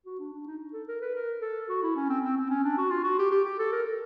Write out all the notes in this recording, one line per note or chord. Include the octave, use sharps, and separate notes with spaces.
F#4
D4
D4
D#4
A4
A#4
B4
A#4
A4
F#4
E4
C#4
C4
C4
C4
C#4
D4
F#4
F4
F#4
G4
G4
G4
A4
A#4